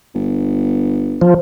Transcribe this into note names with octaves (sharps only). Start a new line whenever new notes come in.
G1
F3